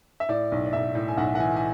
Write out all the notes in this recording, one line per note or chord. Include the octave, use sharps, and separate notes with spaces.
E5
A2 D5
B1
D5
B1 E5
A2
G#5
B1 F#5
F#5
E3 G#5
G#5